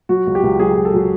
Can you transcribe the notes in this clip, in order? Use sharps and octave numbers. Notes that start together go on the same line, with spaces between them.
F#3 F#4
C#2
G4
C#2
F#3 G#4
C#2
A4
F#3